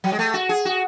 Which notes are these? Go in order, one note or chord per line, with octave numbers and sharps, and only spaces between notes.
F#3
G#3
A3
F#4
G#4
F#4